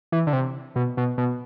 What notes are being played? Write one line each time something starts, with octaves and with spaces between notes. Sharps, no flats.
E3
D3
C3
B2
B2
B2